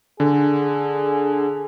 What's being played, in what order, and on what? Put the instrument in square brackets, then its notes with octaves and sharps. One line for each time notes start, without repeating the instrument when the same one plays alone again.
[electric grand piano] D3 [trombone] G#4